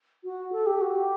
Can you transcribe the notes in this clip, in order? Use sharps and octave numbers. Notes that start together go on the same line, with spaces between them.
F#4
A4
G4
F#4
G4